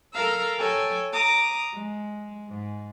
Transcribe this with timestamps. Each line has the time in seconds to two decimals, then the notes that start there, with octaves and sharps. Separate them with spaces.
0.13 A4 A#4 F5 A#5 E6
0.58 A4 C#5 G5 G#5
1.11 A#5 D6 D#6
1.72 G#3
2.48 G#2